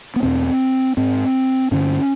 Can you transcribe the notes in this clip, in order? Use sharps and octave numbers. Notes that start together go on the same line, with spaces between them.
B3
E2 B2 C4
G#2 C4
G2 D3 C#4